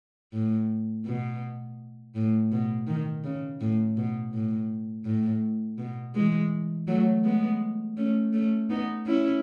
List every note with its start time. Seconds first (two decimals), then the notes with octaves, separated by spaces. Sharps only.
0.33 A2
1.06 B2
2.15 A2
2.52 B2
2.87 D#3
3.24 C#3
3.61 A2
3.97 B2
4.34 A2
5.06 A2
5.78 B2
6.15 E3 G#3
6.88 F#3 A3
7.24 G#3 B3
7.97 A3 C#4
8.33 A3 C#4
8.70 B3 D#4
9.06 C#4 E4